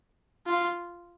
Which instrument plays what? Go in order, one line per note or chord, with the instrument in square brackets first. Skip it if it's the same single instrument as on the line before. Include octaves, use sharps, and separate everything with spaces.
[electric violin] F4